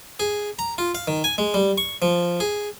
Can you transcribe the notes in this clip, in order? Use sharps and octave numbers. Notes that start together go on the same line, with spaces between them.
G#4
A#5
F4
F5
D#3
G#5
G#3
G3
C#6
F3
G#4